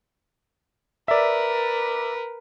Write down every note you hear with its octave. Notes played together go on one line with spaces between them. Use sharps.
A#4 B4 D5 E5